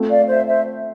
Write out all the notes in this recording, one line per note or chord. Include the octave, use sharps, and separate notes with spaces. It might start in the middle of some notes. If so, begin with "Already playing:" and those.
Already playing: A3 C4 F4 A4
D5 F5
C5 E5
C5 E5